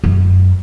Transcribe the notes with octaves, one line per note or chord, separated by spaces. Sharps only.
F#2